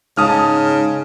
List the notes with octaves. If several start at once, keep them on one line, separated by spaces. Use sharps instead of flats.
G#2 C#3 A5 D#6 F6